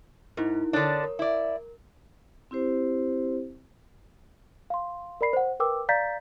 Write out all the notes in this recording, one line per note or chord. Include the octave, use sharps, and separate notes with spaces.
G#2 D#4 E4 A#4
D3 D4 A#4 C#5 D#6
A#4
E4 D5
C4 E4 G4 C5
F5 C6
A#4 D5 B5 C7
C5 F#5
A#4 B4 G5 D6 E6
D5 F5 A#5 G6 A6 B6